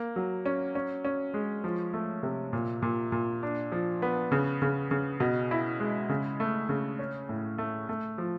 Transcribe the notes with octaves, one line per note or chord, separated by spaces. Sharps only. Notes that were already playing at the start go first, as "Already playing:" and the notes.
Already playing: A#3
F#3
C#4
C#4
C#4
G#3
F3
A3
C3
A#2
A#2
A#2
D4
F3
B3
C#3
C#3
C#3
B2
E4
G#3
C#3
A3
C#3
C#4
A2
A3
A3
F3